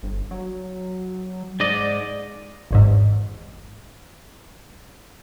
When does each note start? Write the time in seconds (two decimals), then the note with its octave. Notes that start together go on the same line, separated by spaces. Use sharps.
0.03 G1
0.31 F#3
1.60 G#2 D5 D#5
2.71 G#1 E2 G#2